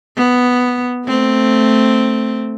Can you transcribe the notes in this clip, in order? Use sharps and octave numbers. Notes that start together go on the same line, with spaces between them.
B3
A3 C4